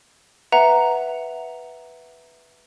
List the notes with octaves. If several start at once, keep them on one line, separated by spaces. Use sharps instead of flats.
B4 E5 F#5 A#5